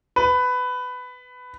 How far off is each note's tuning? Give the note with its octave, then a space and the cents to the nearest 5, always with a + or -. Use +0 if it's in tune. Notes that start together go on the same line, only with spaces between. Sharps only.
B4 +15